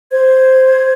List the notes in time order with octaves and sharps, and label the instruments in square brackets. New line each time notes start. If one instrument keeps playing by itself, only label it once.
[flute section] C5 G#6